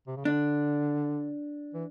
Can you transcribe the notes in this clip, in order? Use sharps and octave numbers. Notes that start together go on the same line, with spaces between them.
C3
C#3
D3 D4
E3